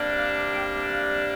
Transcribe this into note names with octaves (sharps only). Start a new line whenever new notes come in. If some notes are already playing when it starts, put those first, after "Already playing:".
Already playing: C3 G3 A#3 D4
F5
G5
F5